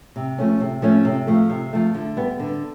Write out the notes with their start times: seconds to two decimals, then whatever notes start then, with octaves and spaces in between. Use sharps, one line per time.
0.16 C3
0.38 F3 A3 C#4
0.60 C3
0.82 F3 A3 C#4
1.05 C3
1.27 F3 A3
1.50 C3
1.73 F3 A3
1.94 D3
2.17 G3 B3
2.40 D3